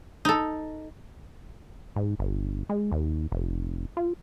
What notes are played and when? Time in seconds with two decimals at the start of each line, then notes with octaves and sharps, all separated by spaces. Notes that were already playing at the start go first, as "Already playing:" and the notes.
0.25 D#4 A4
1.96 G#2
2.19 G1
2.69 G#3
2.92 D#2
3.32 F1
3.97 F4